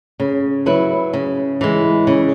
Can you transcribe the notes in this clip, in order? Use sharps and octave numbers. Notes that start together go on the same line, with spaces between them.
C#3
F#3 E4 B4
C#3
E3 G#3
C#3